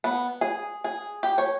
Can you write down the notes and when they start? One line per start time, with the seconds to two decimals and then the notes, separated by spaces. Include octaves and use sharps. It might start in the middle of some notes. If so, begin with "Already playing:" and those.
0.04 B3
0.41 G#4
0.84 G#4
1.23 G4
1.38 C#5